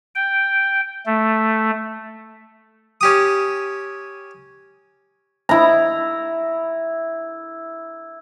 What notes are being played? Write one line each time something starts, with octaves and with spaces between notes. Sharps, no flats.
G5
A3
C#4 G4 D#6
E4 A#5